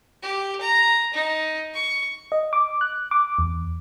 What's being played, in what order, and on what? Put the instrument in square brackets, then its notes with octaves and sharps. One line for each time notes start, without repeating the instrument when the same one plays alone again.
[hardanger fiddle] G4
A#5
D#4
C#6
[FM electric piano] D#5
D6
F#6
D6
E2